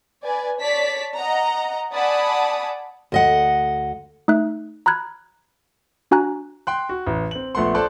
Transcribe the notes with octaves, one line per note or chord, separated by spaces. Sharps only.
B4 D5 G#5
C#5 D5 A5 B6
D#5 F#5 A#5
D5 F#5 G#5 A5 B5 D#6
D2 D#5 F#5
A3 D#4 E5 F#6
A#5 B5 F6 F#6 G#6
D4 F#4 G#5 A#5 F#6
G5 C6 F#6
F#4
A1
C4 F#7
A#1 A3 B3 F#5 C6
A4 C5 D5 A5 C6 F#6